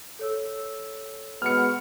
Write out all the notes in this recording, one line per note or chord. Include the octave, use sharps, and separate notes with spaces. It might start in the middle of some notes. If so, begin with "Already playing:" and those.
A4 C#5 E6
G#3 B3 F#4 F6 C#7